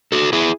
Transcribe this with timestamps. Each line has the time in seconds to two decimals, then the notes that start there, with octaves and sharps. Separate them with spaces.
0.12 F#4 A4
0.33 E4 G#4